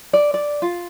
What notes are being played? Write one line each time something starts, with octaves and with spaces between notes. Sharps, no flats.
D5
D5
F4